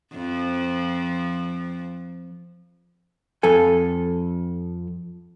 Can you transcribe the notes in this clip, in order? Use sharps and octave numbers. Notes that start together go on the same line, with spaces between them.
F2 F3
F2 A4 G#5